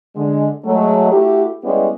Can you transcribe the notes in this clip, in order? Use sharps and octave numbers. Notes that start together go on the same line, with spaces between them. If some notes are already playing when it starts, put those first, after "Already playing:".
D3 G#3
F#3 G#3 A3
A3 E4 F#4 G4
G3 G#3 B3 C#4 E4 G4